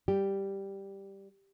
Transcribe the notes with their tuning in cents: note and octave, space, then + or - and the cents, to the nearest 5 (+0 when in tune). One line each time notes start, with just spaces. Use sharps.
G3 +0 G4 +0